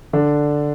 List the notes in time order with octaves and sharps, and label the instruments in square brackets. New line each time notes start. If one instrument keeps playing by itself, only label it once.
[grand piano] D3 D4